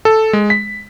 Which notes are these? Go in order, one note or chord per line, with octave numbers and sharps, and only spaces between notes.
A4
G#3
B6